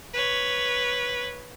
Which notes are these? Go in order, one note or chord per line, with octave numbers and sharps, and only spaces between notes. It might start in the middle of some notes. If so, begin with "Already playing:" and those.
B4 C#5